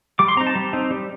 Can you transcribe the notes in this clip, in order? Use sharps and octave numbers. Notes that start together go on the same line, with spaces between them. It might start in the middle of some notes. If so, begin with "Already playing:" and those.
G3 D6
C6
C4 D#4 A#5
A5
G3
C4 D#4
G3